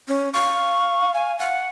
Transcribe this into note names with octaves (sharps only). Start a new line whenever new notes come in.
C#4
F5 C#6
G#5
F5 F#5